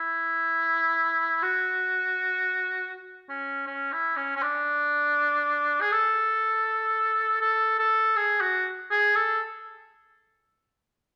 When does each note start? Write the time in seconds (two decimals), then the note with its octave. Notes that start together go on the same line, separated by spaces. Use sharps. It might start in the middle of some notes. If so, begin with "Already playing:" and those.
Already playing: E4
1.43 F#4
3.29 C#4
3.67 C#4
3.92 E4
4.16 C#4
4.36 C#4
4.42 D4
5.81 G#4
5.92 A4
7.41 A4
7.79 A4
8.16 G#4
8.41 F#4
8.91 G#4
9.15 A4